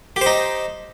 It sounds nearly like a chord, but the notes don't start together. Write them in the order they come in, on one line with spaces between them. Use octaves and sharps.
G4 C5 D#4